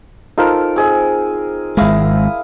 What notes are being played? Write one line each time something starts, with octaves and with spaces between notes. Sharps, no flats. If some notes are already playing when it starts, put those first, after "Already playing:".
D#4 F4 A4 A#4 C5
C4 G#4 D#5
G#1 G#3 E4 F5 D#6